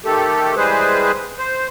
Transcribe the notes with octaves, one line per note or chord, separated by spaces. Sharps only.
D#3 A3 G4 A4
E3 G3 G#3 G#4 B4 C5
C5